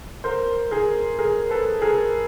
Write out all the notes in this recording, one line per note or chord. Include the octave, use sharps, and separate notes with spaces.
A#4 C5
G#4 A#4
G#4 A#4
A4 B4
G#4 A#4